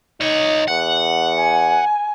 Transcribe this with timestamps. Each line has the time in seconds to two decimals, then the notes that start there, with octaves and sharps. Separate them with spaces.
0.21 D#4 C#5 D#5
0.68 E2 F#5
1.38 G#5